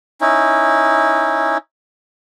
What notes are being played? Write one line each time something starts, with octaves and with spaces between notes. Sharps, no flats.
C#4 D#4 E4